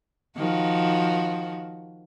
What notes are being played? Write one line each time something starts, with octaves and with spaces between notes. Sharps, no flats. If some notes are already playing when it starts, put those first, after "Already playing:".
D#3 F3 F#4